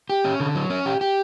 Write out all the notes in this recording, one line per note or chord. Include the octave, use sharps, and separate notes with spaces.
G4
C#4
D3
F#3
C#4
G4
G4